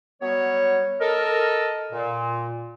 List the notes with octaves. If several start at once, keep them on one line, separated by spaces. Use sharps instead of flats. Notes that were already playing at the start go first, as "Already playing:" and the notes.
F#3 G3 B3 C#5
A4 A#4 D#5
A#2